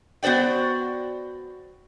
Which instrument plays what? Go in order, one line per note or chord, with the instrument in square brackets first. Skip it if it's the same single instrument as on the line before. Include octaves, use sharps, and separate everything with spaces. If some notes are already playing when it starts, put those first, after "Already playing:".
[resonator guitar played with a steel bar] B3 F#4 C5 D5 G5